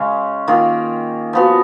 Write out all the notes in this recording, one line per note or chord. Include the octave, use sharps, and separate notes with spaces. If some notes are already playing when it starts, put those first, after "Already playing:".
Already playing: C#3 G#3 C#4
D#3 A#3 F4 G#4
F3 B3 F#4